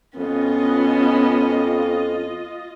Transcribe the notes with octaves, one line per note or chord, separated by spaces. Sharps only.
F2 B3 C#4 F4 D#5